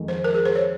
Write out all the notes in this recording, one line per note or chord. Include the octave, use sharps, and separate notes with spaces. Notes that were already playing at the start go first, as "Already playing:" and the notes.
Already playing: F2 D#3 G#3
C5
A#4
G#4
C5
C#5